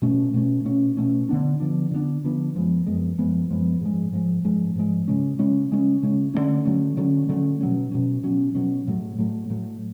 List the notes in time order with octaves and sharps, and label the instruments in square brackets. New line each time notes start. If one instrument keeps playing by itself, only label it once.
[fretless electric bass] B2 A3 C#4
B2 A3 C#4
B2 A3 C#4
B2 A3 C#4
D3 F3 B3 D4
D3 F3 B3 D4
D3 F3 B3 D4
D3 F3 B3 D4
F#2 F3 G#3 B3
F#2 F3 G#3 B3
F#2 F3 G#3 B3
F#2 F3 G#3 B3
G#2 F3 G#3
G#2 F3 G#3
G#2 F3 G#3
G#2 F3 G#3
C#3 G#3 C#4
C#3 G#3 C#4
C#3 G#3 C#4
C#3 G#3 C#4
D3 F#3 A3 C#4
D3 F#3 A3 C#4
D3 F#3 A3 C#4
D3 F#3 A3 C#4
B2 F#3 C#4
B2 F#3 C#4
B2 F#3 C#4
B2 F#3 C#4
A2 F#3 A3
A2 F#3 A3
A2 F#3 A3